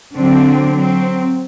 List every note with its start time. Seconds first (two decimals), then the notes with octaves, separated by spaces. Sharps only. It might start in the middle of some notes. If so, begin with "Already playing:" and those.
0.15 D3 F#3 C4 D4
0.75 F#3 C4